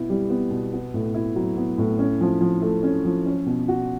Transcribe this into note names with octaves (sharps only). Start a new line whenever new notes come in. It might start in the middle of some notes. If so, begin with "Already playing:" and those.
Already playing: B2 B3 E4
G3
B3
B2
B3
A2
E4
F#3
B3
A2
C#4
F3
F3
A3
C#4
F3
C#4
B2
F#4